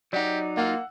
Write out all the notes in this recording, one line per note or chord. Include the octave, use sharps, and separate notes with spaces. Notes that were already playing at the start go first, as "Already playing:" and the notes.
F#3 D#4 G4 D5 D#5 F#5
A#3 F4 F#5 E6